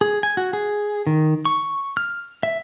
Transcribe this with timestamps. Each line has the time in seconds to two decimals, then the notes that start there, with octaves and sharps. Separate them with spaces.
0.01 G#4
0.23 G#5
0.37 F#4
0.53 G#4
1.07 D#3
1.45 C#6
1.97 F6
2.43 E5